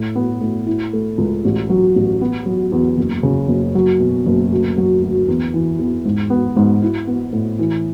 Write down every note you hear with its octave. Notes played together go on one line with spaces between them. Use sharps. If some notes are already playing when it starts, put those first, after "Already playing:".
Already playing: A2
B3
A2
E4
A3
C#2
A1
F#3
A1
B3
F#3
E2
F#1
C#3
F#1
F#3
B2
F#1
D2
F#3
D2
E2
E3
E2
G#2
B3
G#2
E4
B3
A2
E3